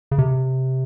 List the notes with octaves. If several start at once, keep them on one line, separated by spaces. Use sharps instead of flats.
C#3
C3